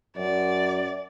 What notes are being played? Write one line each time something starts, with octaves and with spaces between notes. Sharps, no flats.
F#2 D5